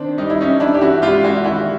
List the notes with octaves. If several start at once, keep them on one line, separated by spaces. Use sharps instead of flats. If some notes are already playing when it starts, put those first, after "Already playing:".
Already playing: D#3 C4 D4
G3 D#4
E4
C#4 D#4
E3 D4 E4
G4
E4 F#4
G#3 F4 G4
E4 F#4
D#3 E4 F#4